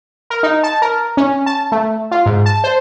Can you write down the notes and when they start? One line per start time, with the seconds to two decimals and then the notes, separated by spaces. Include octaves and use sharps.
0.30 A#4
0.43 D#4
0.63 A5
0.82 A#4
1.17 C#4
1.46 A5
1.72 A3
2.11 F4
2.26 G#2
2.46 A5
2.64 C5